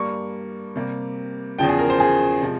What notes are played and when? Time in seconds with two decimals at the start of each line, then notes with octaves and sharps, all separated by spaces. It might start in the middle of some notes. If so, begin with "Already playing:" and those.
Already playing: G2 G3 A#3 C#6
0.76 C3 G3 A#3
1.59 E2 C#3 F3 G5
1.69 G#4
1.79 A#4
1.90 C5
2.00 G#4
2.42 C3 F3 G#3